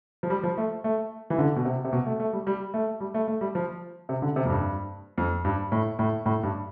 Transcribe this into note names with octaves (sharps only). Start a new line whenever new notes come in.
F3
G3
F3
A3
A3
E3
D3
B2
C3
C3
B2
A3
A3
G3
G3
A3
G3
A3
A3
G3
F3
C3
D3
C3
F2
G2
F2
G2
A2
A2
A2
G2